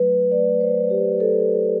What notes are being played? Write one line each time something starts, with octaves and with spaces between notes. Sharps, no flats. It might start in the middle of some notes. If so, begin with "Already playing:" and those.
Already playing: F#3 A3 B4
A3 D5
C5
F#3
G4
A3 A4